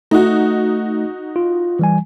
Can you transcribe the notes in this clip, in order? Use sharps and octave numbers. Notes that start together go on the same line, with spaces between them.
A3 D#4 F#4
F4
E3 G3 G#5